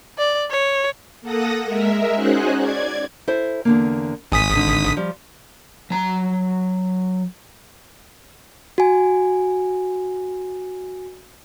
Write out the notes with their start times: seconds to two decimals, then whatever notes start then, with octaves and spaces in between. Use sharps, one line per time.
0.18 D5
0.51 C#5
1.22 A#3 A4 F#5 D#6 A#6
1.64 G#3 A#4 E5
2.14 C#4 D#4 F#4 G#4 C5 F#6
2.58 D5 G#6
3.28 E4 A4 C5
3.65 E2 D3 A#3
4.32 G#1 G#5 D#6 B6
4.55 D3 D#4
4.97 F3 G3
5.90 F#3 A#5
8.78 F#4 G#5